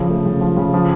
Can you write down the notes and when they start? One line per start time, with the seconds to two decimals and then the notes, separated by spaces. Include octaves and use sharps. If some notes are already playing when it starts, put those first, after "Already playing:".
Already playing: C#3 F3
0.09 A3
0.26 C#3
0.41 F3
0.57 C#3
0.73 F3